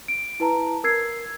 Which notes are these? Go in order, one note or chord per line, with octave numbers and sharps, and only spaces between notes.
D7
E4 B4 A5 A#5
A#4 E6 G#6 C7